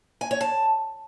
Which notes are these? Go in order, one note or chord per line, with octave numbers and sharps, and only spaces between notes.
G#5
C#5
A5